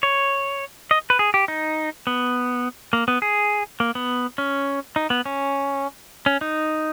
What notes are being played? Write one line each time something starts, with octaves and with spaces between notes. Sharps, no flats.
C#5
D#5
B4
G#4
G4
D#4
B3
A#3
B3
G#4
A#3
B3
C#4
D#4
B3
C#4
C#4
D#4